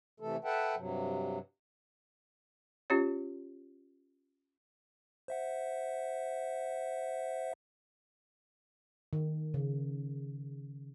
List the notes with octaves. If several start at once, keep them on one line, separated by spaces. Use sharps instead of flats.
C3 E3 A3 A4
A4 B4 E5 F#5 G5 A5
G2 C3 F#3
C#4 F4 G4 C#5
C5 E5 F#5
D#3
C#3